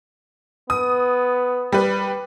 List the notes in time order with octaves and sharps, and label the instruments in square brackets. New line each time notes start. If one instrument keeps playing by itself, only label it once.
[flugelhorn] B3 [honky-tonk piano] D#6
[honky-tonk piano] G3 B4